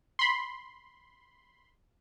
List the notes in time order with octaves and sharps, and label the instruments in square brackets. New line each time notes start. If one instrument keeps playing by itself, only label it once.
[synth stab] B5 C6